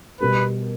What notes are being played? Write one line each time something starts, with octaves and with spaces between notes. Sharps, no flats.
B2 G3 B3 G4 A#4 B4